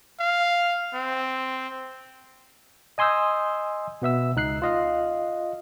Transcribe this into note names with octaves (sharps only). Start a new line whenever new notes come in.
F5
C4
D#5 G#5 C6 D#6 E6 G6
B2 B3 E5 E6
C#2 D#4 F#6 C7
F4 D#5 F5